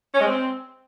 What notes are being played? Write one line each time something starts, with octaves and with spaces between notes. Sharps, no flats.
C#4
G#3
C4